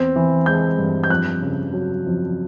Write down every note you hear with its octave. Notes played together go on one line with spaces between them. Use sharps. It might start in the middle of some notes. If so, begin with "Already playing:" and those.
Already playing: E2 C4
E3
G#3 G6
G2
G6
F2 F#6
C#3
F#3
F2